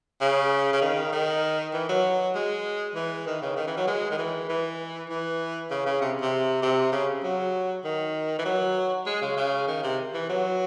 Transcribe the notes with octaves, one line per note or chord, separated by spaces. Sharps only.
C#3
C#3
D#3
D#3
E3
F#3
G#3
E3
D#3
C#3
D#3
E3
F#3
G#3
D#3
E3
E3
E3
C#3
C#3
C3
C3
C3
C#3
F#3
D#3
E3
F#3
G#3
C#3
C#3
D#3
C3
E3
F#3